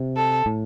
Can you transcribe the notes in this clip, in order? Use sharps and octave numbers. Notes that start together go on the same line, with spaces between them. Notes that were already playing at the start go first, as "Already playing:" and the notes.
Already playing: C3
A4
A2